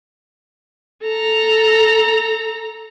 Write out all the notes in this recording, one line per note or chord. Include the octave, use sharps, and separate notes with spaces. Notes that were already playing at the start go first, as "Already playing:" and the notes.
A4 A#5